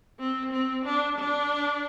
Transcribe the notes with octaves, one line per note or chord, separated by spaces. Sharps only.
C4
C4
D4
D4